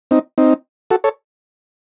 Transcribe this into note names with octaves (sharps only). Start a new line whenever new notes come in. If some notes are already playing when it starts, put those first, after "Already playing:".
C4 D#4
C4 D#4
F#4 A4
A4 C#5